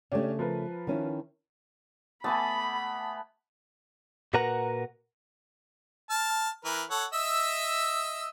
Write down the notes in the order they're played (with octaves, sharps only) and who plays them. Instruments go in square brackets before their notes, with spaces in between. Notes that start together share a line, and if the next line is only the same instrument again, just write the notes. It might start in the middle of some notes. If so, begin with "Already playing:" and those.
[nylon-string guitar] C#3 A3 [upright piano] C#4 D4 G4
[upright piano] F3 A#4 B4
[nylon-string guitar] D#3 C#4 E4
[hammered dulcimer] A3 B3 [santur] G#5 A5 D6 [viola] B5
[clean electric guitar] A#2 F#4 A#4 B4 F#5 A#5
[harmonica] A5 F6
E3 A#4 B4
A4 C#5 F#5
D#5 E5 E6